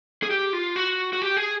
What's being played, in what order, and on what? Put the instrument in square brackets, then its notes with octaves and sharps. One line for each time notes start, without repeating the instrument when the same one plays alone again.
[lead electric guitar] G#4
G4
F4
F#4
F#4
G4
G#4